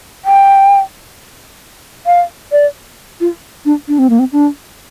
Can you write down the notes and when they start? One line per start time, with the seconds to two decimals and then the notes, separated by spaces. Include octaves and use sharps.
0.25 G5
2.06 F5
2.52 D5
3.20 F4
3.65 D4
3.88 D4
3.99 C4
4.10 A#3
4.19 C4
4.32 D4